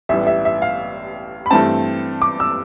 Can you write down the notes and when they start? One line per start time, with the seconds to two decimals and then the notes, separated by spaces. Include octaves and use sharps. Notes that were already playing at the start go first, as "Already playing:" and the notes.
0.09 A1 A2 G3 B3 E5
0.27 E5
0.45 E5
0.62 F5
1.46 B5
1.51 G2 E3 A3 C4 A5
2.22 D6
2.40 E6